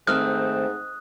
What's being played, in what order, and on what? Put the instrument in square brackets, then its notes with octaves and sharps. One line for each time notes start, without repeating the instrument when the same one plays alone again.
[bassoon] G#2 [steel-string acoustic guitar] D#3 A3 C4 [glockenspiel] D#6 F#6 [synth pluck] F6